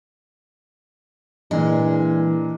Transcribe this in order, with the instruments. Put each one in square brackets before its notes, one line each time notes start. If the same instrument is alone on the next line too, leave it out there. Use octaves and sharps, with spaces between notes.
[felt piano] A#2 D4 [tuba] E3 [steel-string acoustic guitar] G#3